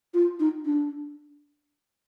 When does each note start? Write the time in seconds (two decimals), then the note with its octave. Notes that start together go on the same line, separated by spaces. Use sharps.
0.14 F4
0.40 D#4
0.66 D4